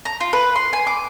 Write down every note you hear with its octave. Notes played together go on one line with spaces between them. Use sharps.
A#5
F4
B4
C6
G#5
D6